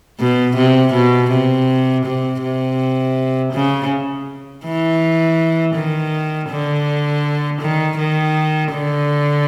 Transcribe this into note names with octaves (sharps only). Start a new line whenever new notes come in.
B2
C3
B2
C3
C3
C3
C#3
E3
D#3
D3
D#3
D#3
D3